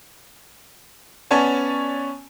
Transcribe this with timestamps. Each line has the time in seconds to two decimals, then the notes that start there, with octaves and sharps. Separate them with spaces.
1.31 B3 C#4 C#5 D5 G#5 A5